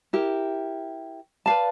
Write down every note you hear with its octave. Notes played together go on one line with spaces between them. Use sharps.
E4 G4 A#4
B4 D5 F5 A5